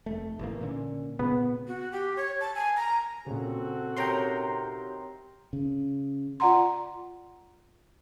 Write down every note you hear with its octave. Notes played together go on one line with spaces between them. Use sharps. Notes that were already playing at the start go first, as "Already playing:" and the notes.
F1 A3
A1 E3 A#3
A#2 D3 C#4
A#2 C#3 B3
F#4
G4
C#5
A5
G#5
A#5
A#2 C#3 C4 F#4 A4
C3 D#3 F#3 G5 A#5 C6
C#3
F4 D5 F#5 A#5 C6